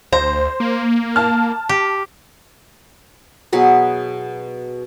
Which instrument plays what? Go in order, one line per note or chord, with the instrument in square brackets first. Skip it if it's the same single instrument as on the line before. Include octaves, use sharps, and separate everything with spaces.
[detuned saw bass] D2 [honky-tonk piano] C5 [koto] A#5
[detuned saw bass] A#3
[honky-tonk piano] A5 F6
[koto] G4
[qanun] B2 F#3 G#4 B4